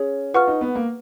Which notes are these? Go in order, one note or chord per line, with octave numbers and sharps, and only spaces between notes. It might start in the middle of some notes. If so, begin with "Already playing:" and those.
Already playing: C#4 G#4 C#5
F4 B4 F#5 C#6 F6
D#4
B3
A#3